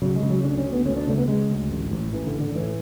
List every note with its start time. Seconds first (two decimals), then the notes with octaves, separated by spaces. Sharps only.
0.02 C#3 F#3
0.16 G#3
0.23 C#3
0.30 F#3
0.44 D2 D4
0.58 C#4
0.65 D2
0.72 B3
0.86 D2 C#4
0.96 D4
1.07 C#3 A3
1.18 B3
1.28 C#3 G#3
1.50 D2
1.70 A1
1.91 A1
2.13 A1 E3
2.27 D3
2.34 A1
2.41 D3
2.55 A2 E3